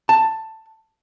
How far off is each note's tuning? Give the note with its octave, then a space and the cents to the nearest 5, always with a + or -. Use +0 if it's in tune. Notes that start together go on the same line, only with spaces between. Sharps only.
A5 +10